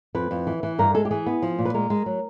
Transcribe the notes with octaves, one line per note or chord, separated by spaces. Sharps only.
F2 B4
F2
E3
E3
G2 A#4
G#3 A4
G4
E3 G#4
B3
F3
A#2
B4
G#3 A#4
G#3
F#3